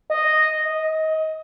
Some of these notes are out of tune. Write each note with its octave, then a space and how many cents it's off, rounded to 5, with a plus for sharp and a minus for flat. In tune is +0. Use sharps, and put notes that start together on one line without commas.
D#5 -5
D#5 +25